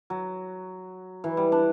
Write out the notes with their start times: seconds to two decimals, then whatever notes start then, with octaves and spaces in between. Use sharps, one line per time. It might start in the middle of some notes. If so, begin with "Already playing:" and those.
0.10 F#3
1.24 E3
1.37 G3
1.52 D4